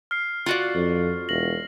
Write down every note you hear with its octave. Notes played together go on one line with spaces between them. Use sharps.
F6 C7
F4 F#4 D5
F2
E1 A#6 F#7